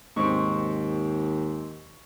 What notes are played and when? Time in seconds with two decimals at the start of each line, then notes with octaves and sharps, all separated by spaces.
0.16 D#2 G#2 C4 C#6